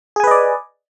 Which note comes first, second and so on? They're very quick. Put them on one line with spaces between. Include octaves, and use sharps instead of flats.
G#4 G#5 B4 D#5 D5